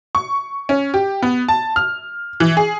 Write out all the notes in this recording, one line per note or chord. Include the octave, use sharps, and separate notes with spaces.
C#6
C#4
G4
B3
A5
F6
E3
G#4